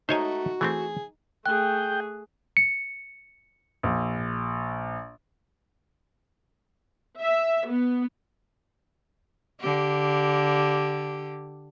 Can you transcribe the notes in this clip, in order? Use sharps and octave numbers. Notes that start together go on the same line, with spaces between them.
A3 D#4 F#4 C5 C#5 G#5
E3 A3 C4 G#4
A3 G#4 G5 F#6
C#7
A#1
E5
B3
D3 G4